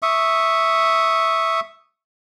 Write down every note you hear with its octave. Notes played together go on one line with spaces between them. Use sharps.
E5 C#6 D#6